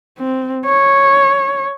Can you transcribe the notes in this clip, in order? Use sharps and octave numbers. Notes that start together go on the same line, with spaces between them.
C4
C#5